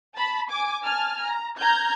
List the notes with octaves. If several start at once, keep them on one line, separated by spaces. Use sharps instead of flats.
A5 B5
G#5 D6
G#5 A5 F6
A#5
A#5 F6 G6 G#6